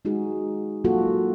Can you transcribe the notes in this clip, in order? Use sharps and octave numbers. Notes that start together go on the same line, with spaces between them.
G#3 D#4 F#4 G#4
F#3 A#3 F4 F#4 A4